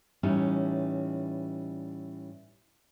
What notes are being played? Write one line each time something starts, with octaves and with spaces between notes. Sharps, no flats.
A2 E3 G3 C#4 D#4